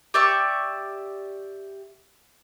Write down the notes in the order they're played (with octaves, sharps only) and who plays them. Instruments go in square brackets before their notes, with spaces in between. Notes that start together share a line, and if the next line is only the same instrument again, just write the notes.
[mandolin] G4 D5 E5 C#6